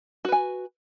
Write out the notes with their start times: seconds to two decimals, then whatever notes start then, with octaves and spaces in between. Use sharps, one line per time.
0.25 F#4
0.28 B4
0.32 G#5